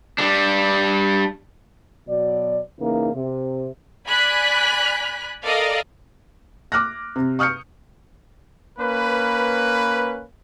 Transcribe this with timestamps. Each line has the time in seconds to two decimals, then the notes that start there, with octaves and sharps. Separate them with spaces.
0.18 G3 D4
2.08 B2 F#3 D5
2.80 C#3 E3 A#3 D#4
3.14 C3
4.07 D5 G#5 B5 F#6 B6
5.44 A4 A#4 D5 D#5 F5
6.72 D6 F6 F#6 A#6
7.16 C3
7.39 C#6 D#6 F6 G6 C#7
8.79 A#3 C#4 B4